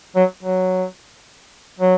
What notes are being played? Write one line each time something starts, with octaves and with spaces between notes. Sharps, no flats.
F#3
F#3
F#3